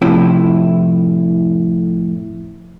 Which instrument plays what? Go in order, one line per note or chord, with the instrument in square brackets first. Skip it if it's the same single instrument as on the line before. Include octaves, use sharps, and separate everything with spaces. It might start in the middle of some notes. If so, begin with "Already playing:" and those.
[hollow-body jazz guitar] F2 A2 C3 E4